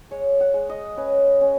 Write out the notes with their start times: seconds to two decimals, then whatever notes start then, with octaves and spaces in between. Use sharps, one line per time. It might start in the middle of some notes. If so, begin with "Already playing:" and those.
0.11 G#3 C#5
0.41 F#5
0.54 G#3
0.69 D#5
0.97 C#4 B4
1.41 C#4